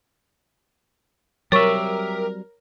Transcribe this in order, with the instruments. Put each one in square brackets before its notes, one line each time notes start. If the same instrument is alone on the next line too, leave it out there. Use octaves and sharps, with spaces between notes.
[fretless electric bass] F#3 G3 C4 [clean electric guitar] G4 E5 [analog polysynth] A#4 [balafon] C#5 C#6